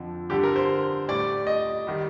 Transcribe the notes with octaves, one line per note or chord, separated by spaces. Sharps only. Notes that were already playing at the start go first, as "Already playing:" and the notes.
Already playing: F2 D3 F3
G2 D3 G3 G4
A#4
C5
A2 G3 D5
D#5
D#3 G3